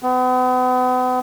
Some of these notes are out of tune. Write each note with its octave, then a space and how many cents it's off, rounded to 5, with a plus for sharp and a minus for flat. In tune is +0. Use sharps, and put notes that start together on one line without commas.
B3 +40